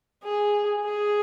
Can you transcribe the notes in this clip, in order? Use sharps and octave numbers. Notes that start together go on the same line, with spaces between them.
G#4
G#4